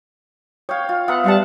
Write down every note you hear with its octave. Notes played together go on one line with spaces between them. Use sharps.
C#5 F5 G5
F4
B3 E5 F#5 A#5
G3 F5 F#5 A5